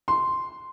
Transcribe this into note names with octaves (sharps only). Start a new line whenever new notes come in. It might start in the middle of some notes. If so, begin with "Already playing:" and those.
C6